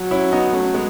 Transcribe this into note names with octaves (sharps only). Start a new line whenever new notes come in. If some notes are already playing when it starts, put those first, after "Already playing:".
Already playing: F#3
C#4 E4
B3 D#4
A3 C#4
G#3 B3